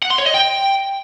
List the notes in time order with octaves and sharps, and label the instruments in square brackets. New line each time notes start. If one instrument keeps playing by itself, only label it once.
[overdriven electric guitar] F#5
C6
C#5
D#5
G5